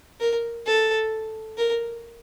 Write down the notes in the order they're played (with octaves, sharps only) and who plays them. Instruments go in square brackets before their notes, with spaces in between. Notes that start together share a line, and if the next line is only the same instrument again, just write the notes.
[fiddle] A#4
A4
A#4